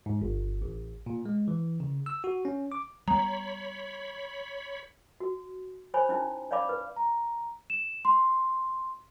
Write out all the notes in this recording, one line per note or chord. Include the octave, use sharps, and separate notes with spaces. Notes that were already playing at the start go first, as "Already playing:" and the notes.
G#2
G1
A1
A#2
G#3
E3
C#3
E6
F#4
C#4
D6
G3 B3 C#5 A#5 B5
F#4
C5 C#5 G#5 B5
C#4 D#4 E4
C#5 D5 F5 B5 D6
B4
A#5
E7
C6